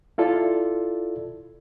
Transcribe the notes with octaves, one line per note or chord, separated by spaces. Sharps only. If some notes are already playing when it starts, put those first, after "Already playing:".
E4 F4 A4 D5